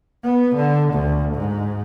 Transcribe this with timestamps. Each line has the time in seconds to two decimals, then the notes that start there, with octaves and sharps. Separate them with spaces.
0.24 B3
0.56 D3
0.93 D2
1.34 G#2